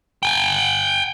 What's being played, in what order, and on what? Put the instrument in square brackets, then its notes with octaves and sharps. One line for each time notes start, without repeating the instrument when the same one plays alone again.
[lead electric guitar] G5 G#5